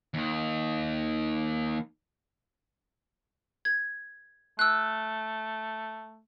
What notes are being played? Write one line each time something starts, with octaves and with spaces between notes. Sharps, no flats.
D#2 D#3
G#6
A3 E6 F#6